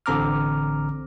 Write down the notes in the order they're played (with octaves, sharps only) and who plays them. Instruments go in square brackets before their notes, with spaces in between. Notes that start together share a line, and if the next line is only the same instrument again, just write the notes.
[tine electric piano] A1 D3 C4 A#5 D6 F6